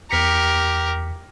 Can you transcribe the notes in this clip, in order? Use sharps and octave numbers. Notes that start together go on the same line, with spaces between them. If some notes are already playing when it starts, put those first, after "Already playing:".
E2 G4 A#4 B6 C#7